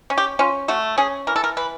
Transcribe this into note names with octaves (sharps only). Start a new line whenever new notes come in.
C#4
G4
C#4 F4
A3 F#4
C#4 G#4
E3 A#4
A4
A#4
E3 B4